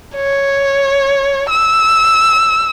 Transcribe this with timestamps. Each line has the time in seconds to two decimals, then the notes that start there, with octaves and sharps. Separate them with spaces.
0.16 C#5
1.50 E6